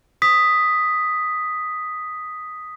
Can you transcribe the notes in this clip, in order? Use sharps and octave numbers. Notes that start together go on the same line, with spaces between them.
D#6 B6